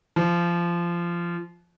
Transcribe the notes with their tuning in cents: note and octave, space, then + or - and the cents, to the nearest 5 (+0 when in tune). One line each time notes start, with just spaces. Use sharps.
F3 -20